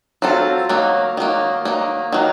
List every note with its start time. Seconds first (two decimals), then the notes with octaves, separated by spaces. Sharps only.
0.22 F#3 C4 F4 A4
0.69 D#3 F#3 A#3
1.17 D#3 F#3 A#3
1.65 D#3 F#3 A#3
2.13 D#3 F#3 A#3